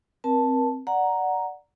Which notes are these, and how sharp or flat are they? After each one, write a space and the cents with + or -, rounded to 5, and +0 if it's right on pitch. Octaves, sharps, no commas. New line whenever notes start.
C4 +0 A#4 +35 A5 +0
D5 +0 F#5 +0 A#5 +0